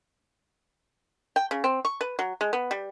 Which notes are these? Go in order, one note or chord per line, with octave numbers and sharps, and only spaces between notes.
G5
C#3
C4
C#6
B4
F#3
G#3
B3
G3